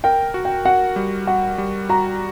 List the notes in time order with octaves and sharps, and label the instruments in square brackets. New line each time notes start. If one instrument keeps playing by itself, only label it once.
[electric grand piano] A#4 [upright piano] G5
[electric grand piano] F#4
[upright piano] G5
[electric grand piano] F#4 [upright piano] F#5
[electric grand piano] G3
[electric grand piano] F#4 [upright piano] F#5
[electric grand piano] G3
[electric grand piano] F#4 [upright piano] A#5